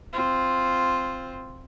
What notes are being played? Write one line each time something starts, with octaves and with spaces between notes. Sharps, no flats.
C4 F4